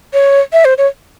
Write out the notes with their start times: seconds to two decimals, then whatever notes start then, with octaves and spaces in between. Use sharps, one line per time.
0.13 C#5
0.53 E5
0.65 C5
0.78 C#5